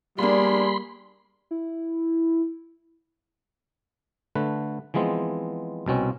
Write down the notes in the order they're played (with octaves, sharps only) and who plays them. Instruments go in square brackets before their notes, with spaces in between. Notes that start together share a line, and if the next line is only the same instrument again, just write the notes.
[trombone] G3 [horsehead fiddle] A#3 G#4 [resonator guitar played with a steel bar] B3 D4 [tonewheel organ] B5 C6
[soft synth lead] E4
[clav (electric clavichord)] D3 A3 B4
E3 F3 G#3 B3 C4
C2 B2 C4 C#4